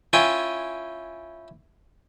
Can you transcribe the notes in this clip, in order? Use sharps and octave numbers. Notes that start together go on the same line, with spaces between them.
C#4 E4 F4 G5 G#5